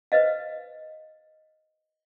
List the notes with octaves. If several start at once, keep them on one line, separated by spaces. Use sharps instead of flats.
B4 C5 D#5 F5